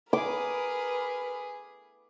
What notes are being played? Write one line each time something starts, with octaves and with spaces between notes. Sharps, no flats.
G#4 A#4 B4 D6